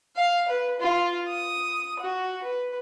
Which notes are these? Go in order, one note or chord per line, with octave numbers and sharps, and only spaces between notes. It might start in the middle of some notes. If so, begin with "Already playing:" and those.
F5
B4
F4
D#6
F#4
B4